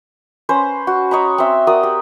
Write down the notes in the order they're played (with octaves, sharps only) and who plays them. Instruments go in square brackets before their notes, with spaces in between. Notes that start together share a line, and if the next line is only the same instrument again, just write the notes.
[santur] C#4 B4 C5
F#4
C#5 D#5 A#5 B5
C4 E5
F#4 A#4 D5 D#6
G4